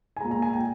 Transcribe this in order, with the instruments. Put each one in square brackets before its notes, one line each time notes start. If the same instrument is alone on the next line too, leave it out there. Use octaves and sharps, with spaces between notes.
[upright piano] G#5
G#3 A#5
A#2
A#5
G#5
G5